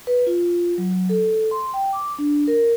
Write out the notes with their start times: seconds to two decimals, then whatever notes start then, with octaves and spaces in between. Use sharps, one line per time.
0.07 B4
0.27 F4
0.78 F#3
1.09 A4
1.51 C6
1.74 G5
1.93 D6
2.19 D4
2.47 A#4